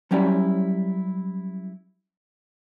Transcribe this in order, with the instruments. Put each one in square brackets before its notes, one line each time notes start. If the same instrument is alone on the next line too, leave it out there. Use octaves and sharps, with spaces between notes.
[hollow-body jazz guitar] F#3 G3 C#4 E4 G4 D5